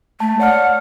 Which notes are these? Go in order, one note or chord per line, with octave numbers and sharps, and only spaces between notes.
A3 A5
C#5 D5 F#5 F6